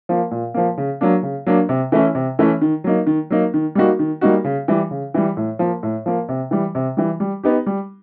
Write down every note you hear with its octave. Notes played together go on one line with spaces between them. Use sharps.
F3 A#3
A#2
F3 A#3
C#3
F#3 A#3 D4
C#3
F#3 A#3 D4
C3
E3 A3 C#4 E4
C3
E3 A3 C#4 E4
D#3
F#3 A#3 D#4
D#3
F#3 A#3 D#4
D#3
G3 A#3 D#4 F#4
D#3
G3 A#3 D#4 F#4
C#3
E3 G3
C#3
E3 G3
A2
F3 A#3
A2
F3 A#3
C3
E3 G3
C3
E3 G3
G3
B3 D#4 G4
G3